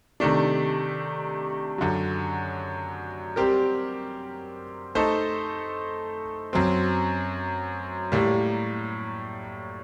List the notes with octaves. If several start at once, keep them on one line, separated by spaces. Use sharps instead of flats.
C3 D#3 A3 D4
F#2 D3 F#3
G3 C4 G4 A#4
A3 D#4 A4 C5
F#2 F#3 C4
A2 G3 A#3